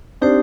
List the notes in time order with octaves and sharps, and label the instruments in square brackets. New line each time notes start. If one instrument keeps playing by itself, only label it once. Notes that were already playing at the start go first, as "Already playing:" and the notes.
[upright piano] C4 D4 [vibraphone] D#4 G4 C5